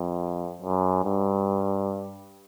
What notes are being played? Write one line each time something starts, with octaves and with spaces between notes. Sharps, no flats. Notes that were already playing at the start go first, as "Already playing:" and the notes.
Already playing: F2
F#2
G2